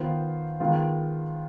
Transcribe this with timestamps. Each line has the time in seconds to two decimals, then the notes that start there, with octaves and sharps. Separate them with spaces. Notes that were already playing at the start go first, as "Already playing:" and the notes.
Already playing: D#3 B3 F4 C5
0.60 D#3 G#3 B3 F4